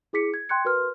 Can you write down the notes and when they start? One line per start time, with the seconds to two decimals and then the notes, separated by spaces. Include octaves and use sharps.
0.13 E4 G#4 D6 B6 C#7
0.34 G#6
0.49 G5 C6 F#6 G#6 C#7
0.65 F#4 A#4 B4 C6 F6